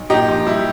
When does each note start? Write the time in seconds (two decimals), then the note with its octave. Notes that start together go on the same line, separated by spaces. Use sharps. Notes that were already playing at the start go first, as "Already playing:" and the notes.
Already playing: B1
0.10 A#2 D#4 G4
0.29 A#1
0.46 G3 E4